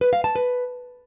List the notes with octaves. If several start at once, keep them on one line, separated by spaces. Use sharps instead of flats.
B4
F5
A5
B4